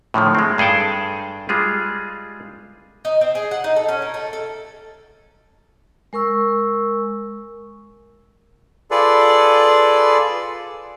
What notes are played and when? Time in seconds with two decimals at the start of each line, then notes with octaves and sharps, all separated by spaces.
0.14 A2 D3 D#3 F3
0.35 G#3 C4
0.58 G2 G#4 A4 G5 A5
1.49 G3 G#3 F4 G#4
3.05 D#4
3.21 C4
3.35 G#4
3.51 F#5
3.64 D#4
3.76 A4
3.89 C#4
4.02 A#4
4.14 A3
4.33 A4
6.13 G#3 A#4 C#6 E6
8.91 F4 G#4 A4 B4 D5